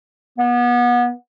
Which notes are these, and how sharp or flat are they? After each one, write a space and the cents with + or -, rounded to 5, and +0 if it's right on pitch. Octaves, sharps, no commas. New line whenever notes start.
B3 -30